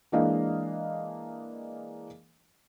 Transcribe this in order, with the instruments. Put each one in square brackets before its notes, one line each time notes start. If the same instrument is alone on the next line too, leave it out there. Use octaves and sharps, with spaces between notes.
[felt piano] E3 G#3 A#3 D4 D#5 F5